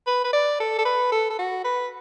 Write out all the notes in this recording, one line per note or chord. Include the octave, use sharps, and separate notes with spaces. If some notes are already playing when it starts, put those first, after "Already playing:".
B4
B4
D5
A4
A4
B4
A4
A4
F#4
B4